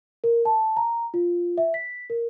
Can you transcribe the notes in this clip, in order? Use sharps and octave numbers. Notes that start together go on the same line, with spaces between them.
A#4
A5
A#5
F4
E5
B6
A#4